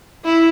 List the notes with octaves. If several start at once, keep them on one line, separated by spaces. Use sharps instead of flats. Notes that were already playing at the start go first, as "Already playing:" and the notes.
E4